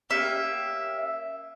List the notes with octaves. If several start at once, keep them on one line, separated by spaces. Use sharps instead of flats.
A#3 C#4 G4 E5